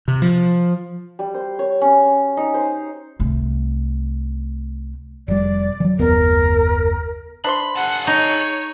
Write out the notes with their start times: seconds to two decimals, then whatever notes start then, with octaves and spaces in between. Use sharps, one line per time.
0.08 C3
0.22 F3
1.19 G3
1.34 C5
1.59 C#5
1.81 C#4
2.37 D#4
2.54 C5
3.20 C2 A3
5.28 F1 G3 D5
5.80 E3 F#3
5.99 F#1 D#2 B3 A#4
7.44 D4 C5 B5 C6
7.76 G#4 F#5 A5
8.07 D#4 C#5